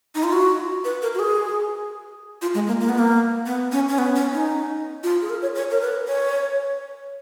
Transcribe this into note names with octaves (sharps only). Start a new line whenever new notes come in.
D#4
F4
F#4
B4
A#4
F#4
G#4
F4
G#3
A#3
A#3
B3
A#3
B3
C#4
C#4
B3
C#4
D#4
F4
G#4
A#4
C#5
C#5
A#4
B4
C#5